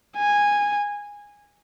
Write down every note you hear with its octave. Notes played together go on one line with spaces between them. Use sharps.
G#5